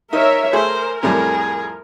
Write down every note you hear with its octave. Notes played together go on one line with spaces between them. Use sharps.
D#4 A#4 C#5 E5
A3 G#4 A#4 C5
F2 A2 G3 G#4